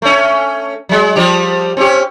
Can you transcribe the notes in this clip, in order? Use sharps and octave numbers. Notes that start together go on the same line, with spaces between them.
A3 C#4
F#3 G#3
F3 G3 G4
C4 C#4 G4